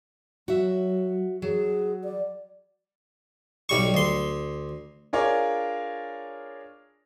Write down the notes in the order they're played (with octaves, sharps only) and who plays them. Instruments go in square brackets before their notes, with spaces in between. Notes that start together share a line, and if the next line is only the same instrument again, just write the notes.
[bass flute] F#3 [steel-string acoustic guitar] F#4 E5
[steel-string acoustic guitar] F#3 [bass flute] G#4
[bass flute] D5
[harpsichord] B1 G3 C#6
D2 C6
[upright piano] D4 F4 G#4 A#4 C#5 D5